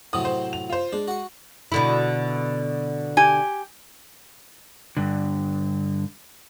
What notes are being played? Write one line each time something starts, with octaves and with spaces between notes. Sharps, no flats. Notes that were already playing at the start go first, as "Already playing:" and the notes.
A2 C3 F#3 D#6
C5
F7
F4 C5
G#3 D4
F#4 C#6
B2 D3 E4
G4 G#5
G2 D3